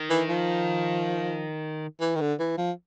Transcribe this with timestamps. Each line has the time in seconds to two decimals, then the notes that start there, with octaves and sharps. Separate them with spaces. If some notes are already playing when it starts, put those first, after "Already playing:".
Already playing: D#3
0.10 E3
0.29 F3
2.00 E3
2.15 D#3
2.21 D3
2.40 E3
2.58 F3